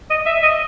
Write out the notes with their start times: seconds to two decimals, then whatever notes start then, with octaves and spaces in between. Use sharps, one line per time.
0.10 D#5
0.26 E5
0.43 D#5